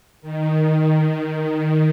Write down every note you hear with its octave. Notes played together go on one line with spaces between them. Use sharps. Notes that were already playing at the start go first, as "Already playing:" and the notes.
D#3